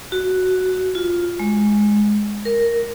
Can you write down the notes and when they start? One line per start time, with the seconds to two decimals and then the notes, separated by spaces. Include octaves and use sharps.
0.12 F#4
0.95 F4
1.39 G#3
2.45 A#4